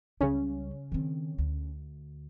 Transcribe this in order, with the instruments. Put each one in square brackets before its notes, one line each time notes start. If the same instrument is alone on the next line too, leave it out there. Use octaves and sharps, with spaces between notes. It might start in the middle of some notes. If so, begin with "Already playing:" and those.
[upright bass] C#2 G3 [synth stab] C#3 C#4
[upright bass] D#3 C4
D2